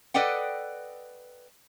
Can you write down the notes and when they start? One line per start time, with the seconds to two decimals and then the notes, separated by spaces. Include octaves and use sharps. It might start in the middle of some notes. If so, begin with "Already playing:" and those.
0.14 A4 B4 D5 D#5 F#5 G5